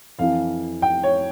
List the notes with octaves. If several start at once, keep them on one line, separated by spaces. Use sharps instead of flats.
F2 E3 F5
G5
C#5